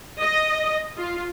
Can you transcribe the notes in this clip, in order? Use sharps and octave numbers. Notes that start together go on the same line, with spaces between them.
D#5
F4